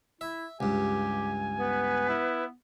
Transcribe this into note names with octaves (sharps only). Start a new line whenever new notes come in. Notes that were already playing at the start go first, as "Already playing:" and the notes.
E4 E5
C#2 G2 G4 G#5
B3 B4
E4